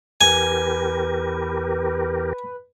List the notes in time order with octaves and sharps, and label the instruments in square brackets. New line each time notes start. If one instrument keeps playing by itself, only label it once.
[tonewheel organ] E2 G4 A#4 [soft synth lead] B4 [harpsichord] G#5